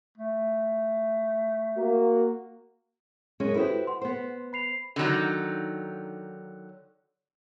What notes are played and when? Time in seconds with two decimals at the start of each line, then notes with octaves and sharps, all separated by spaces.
0.18 A3
1.78 A#3 F#4
3.40 F#2 G#3 C#4
3.55 E4 F#4 G4 A4 B4 C5
3.87 F#5 C6
4.02 B3 C5
4.53 B5 C7 F7
4.96 D3 D#3 F#3 D#4